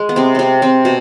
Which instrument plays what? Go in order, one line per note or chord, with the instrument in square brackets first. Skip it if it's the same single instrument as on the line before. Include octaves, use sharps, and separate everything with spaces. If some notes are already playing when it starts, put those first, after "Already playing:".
Already playing: [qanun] G#3
B3
C3 C4
C3 B3 C4
C3 C4
B2